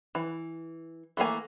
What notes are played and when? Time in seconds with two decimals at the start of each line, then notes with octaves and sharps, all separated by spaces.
0.15 E3
1.17 E3 A3 A#3 G#5